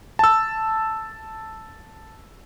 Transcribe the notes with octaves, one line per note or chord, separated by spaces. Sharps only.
A5 E6